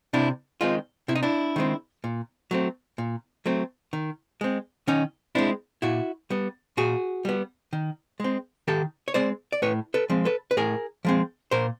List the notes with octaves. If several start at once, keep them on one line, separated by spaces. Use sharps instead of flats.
C3 D4 E4
D#3 G#3 C4 D#4 F4
C3 E4
D#4
D4 E4
D#3 G#3 C4
A#2
F#3 A3 C4
A#2
F#3 A3 C4
D#3
G#3 C4
D#3 C#4 D#4
G#3 C4 D4 E4
A#2 E4 F#4
G3 B3
A#2 F#4 G#4
G3 B3
D#3
G#3 C4
D#3 G4 A4
C#5
G#3 C4 C5 D5
D5
A2 B4 C#5
A4 B4
F3 G#3 C4
A4 B4
B4
A2 G#4 A#4
F3 G#3 C4
A#2 A#4 C5